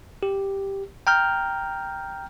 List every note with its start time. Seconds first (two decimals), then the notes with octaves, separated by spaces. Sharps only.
0.23 G4
1.07 G5 A#5 F6 G6